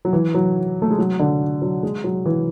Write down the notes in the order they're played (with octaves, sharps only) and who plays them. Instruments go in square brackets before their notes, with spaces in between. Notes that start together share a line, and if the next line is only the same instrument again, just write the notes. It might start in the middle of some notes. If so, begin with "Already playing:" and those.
[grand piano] F#3
E3
F#3
A3
G#3
F#3
D3
F#3
G#3
F#3
E3